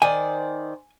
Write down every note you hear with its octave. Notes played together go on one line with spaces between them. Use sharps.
D#3 C5 D5 G#5